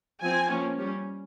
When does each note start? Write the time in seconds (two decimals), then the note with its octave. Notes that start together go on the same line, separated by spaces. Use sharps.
0.22 F3 C4 G#5
0.50 F3 A#3 C#4
0.78 G3 C#4